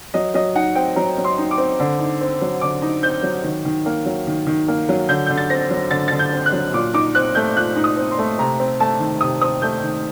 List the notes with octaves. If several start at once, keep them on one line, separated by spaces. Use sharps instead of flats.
F#3 D#5
F#3 D#5
D#4 F#5
C4 G5
F#3 A#5
F#3
C6
D#4
D6
C4
D3
D#4
C4
F#3
D3 D6
D#4
C4 G6
F#3
D#3
D#3
A#3
F#3
D#3
D#3
A#3
F#3
D3 G6
D3 G6
A6
C4 A#6
F#3
D3 A6
D3 A6
G6
C4
F#6
F#3
A#2 D6
D#4 D6
C4 F#6
A3 G6
A#2 F#6
D#4
D#6
C4
C6
A3
C3 A#5
C4
A3 A5
D#3
C3 D#6
C4 D#6
A3 G6
D#3